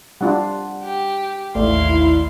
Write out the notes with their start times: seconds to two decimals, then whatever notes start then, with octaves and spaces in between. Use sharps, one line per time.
0.21 G3 D4 F4 F#5
0.83 G4
1.55 A1 D#2 A3 E4 D5 F5 C6